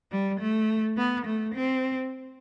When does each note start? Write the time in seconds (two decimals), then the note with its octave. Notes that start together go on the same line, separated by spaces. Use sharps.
0.11 G3
0.40 A3
0.97 B3
1.26 A3
1.55 C4